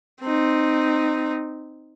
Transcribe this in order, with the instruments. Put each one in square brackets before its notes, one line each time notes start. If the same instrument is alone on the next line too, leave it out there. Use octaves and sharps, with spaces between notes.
[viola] C4 D#4